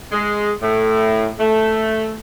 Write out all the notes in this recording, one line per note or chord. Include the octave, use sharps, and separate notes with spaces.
G#3
A2
A3